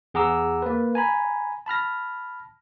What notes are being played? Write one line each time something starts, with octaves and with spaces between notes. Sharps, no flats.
E2 G#4 F#5 A#5 D6 E6
A#3 B4
G#5 A#5 B5
A5 B5 F6 A#6